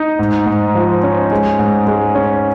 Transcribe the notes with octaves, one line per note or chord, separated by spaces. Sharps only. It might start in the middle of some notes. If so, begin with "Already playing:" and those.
Already playing: D#4
G#2
G#2
F3
C#4
G#3
G#2
G#3
C#4